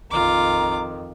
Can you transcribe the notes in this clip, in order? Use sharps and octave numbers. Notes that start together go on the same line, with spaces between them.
A#1 F2 D#3 F4 A#5 D6